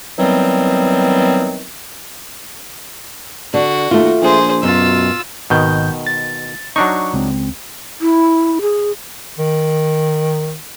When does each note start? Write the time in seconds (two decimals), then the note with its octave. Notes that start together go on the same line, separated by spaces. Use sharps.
0.18 D#3 E3 F#3 G3 B3 C4
3.54 D3 D4 F#4
3.91 D#2 A3 F4
4.22 A#1 G#4 C5
4.63 F#2 B2 F4 E6
5.50 G#1 B2 D#3 G6
6.07 A6
6.76 F#3 D4 D#4 C#6
7.13 C#2 C4
8.01 E4
8.62 G#4
9.38 D#3